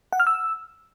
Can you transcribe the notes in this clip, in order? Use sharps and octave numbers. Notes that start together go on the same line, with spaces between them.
F#5
F6
E6